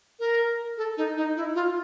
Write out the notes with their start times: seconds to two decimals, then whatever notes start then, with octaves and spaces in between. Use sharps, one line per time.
0.19 A#4
0.77 A4
0.97 D#4
1.17 D#4
1.36 E4
1.55 F4